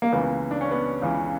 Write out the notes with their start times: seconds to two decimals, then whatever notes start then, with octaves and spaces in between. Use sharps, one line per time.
0.02 A#3
0.12 C#2 C#3 E3 B3
0.51 D4
0.61 C#4
0.71 B3
1.02 C#2 C#3 E3